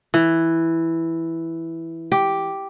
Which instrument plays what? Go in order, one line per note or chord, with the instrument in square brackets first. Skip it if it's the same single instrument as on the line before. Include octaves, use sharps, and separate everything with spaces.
[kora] E3
G4